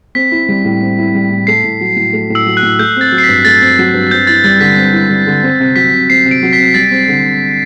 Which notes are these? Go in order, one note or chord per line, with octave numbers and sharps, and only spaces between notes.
C4 B6
E4
G3
A2
C4
E4
G3
A2
A3 C7
A2
F#3
A2
A3
A2
E6
F#3
F#6
A2
A3 G6
C4 A6
F#3
C7
B6
G2
A3 A6
C4
F#3
G2
C4 G6
E4 A6
G3 A6
D3 B6
C4
E4
G3
D3
C4
C3
F#3 B6
C3
C4 C7
C3
D7
F#3
B6
C3
G3 A6
C4
D3